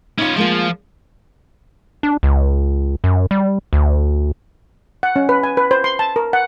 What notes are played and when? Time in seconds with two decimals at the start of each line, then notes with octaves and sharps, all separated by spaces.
0.19 B3 C#4 D#4 F4
0.37 F3 G#3 A#3 F4
2.03 D4
2.23 C#2
3.04 F#2
3.31 G3
3.73 D2
5.03 F#5
5.16 C#4
5.29 B4
5.43 G#5
5.57 B4
5.71 C5
5.84 C6
5.99 A5
6.16 A#4
6.33 F#5